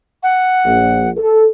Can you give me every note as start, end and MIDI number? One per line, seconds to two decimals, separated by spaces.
0.23 1.10 78
0.66 1.09 34
1.17 1.46 69